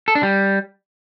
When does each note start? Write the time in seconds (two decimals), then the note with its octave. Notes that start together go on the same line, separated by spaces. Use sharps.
0.08 A4
0.15 D4
0.23 G3